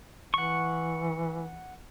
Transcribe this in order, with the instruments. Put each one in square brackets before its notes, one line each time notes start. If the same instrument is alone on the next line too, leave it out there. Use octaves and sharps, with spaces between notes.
[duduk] E3 [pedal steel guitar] F#5 C#6